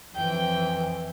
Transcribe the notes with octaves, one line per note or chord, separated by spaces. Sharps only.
F2 E3 G5